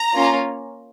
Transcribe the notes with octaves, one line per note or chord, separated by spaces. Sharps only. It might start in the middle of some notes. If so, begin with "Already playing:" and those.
Already playing: A#5
A#3 C#4 F4